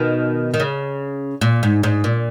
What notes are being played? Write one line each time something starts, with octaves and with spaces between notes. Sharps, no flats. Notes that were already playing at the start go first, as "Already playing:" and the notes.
Already playing: B2 D#3
D#3
C#3
A#2
G#2
G#2
A#2